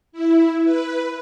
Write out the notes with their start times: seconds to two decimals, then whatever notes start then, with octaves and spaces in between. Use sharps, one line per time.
0.12 E4
0.64 B4